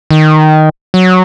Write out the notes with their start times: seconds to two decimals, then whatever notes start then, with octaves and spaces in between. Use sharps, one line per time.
0.11 D#3
0.94 F#3